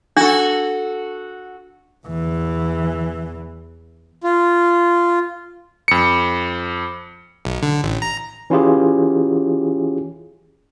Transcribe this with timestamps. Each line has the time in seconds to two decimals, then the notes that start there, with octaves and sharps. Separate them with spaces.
0.17 D4 F#4 A4
2.07 E2 E3
4.24 F4
5.88 F2 C#7
7.45 B1
7.63 D3
7.83 A1
8.02 A#5
8.50 E3 C#4 E4 F4 G4 G#4